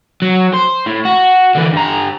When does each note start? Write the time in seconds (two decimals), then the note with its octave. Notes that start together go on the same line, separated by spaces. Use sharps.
0.22 F#3
0.54 C5
0.87 A2
1.05 F#4
1.55 D3 E3
1.73 G2 A#5